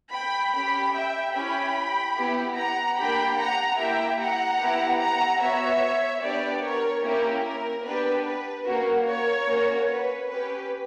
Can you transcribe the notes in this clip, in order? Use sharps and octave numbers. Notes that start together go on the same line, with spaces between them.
G5 B5
C#4 G4 G5 B5
E5 G5
C#4 E4 G4 G5 B5
B3 E4 G4
F#5 A#5
A#3 D4 G4 G5 B5
F#5 A#5
A#3 E4 G4 E5 G5
F#5 A#5
B3 E4 G4
F#5 A#5
B3 F#4 C#5 E5
B3 D4 G4 B4 D5
A#4 C#5
A#3 C#4 E4 G4 A#4
A#4
B3 D4 G4 B4
B4
A#3 C#4 F#4 A#4
A#4 C#5
A#3 C#4 F#4
B4
C#4 G4 B4